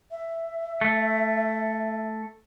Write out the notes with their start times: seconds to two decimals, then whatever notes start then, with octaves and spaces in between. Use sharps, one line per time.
0.11 E5
0.81 A3